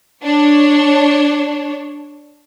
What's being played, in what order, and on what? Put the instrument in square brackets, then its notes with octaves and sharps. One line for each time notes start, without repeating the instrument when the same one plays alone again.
[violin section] D4 C#5